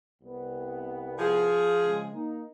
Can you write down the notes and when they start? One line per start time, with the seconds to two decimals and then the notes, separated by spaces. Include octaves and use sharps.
0.22 C2 B3
1.19 F3 G#4
1.82 C#3 G#3
2.13 A#3 D#4